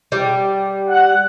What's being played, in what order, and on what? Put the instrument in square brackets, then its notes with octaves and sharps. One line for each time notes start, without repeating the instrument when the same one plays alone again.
[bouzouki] G3
[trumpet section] F#5